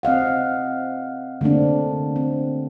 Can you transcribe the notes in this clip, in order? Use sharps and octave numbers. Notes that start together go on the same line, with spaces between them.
C4 D#5 F5 F#5
D3 A3 A#3 C4 D4
C4